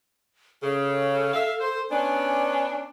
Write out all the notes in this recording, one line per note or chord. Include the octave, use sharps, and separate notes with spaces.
C#3 A4
E5 F5
C5
B3 C#4 D4 G#5